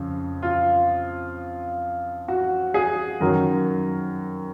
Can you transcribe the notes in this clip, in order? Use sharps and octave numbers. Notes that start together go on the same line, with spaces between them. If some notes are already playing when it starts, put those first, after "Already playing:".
Already playing: F2 C#3 F3
F4
F#4
G#4
F#2 D#3 F#3 A#4